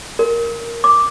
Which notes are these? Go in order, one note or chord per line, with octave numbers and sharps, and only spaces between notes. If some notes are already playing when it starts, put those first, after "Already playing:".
A#4
D6